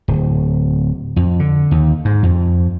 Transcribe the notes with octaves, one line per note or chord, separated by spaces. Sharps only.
D1
F2
D3
D#2
G#2
F2